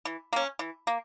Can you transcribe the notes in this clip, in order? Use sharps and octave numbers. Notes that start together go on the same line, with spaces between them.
E3
A#3 C#4
E3
A#3